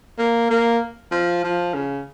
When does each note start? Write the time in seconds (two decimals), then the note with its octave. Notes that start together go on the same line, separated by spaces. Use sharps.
0.18 A#3
0.50 A#3
1.11 F3
1.44 F3
1.74 C#3